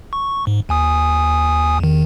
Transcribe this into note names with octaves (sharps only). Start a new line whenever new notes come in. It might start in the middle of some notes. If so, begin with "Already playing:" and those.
C#6
G#2
D#2 G#5 D#6
E2 D#3